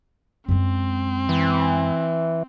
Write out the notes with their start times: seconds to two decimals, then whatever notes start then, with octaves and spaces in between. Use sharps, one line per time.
0.48 F#2 G#3 C4
1.29 E3